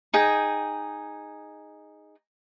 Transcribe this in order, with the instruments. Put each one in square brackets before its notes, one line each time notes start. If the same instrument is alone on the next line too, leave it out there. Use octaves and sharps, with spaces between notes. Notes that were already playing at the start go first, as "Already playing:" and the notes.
[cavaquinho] D#4 G#4 G5